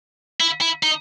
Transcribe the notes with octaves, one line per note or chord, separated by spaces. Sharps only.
E4
E4
D#4